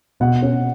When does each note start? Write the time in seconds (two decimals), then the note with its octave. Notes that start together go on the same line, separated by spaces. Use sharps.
0.20 B2 F#5
0.42 C#4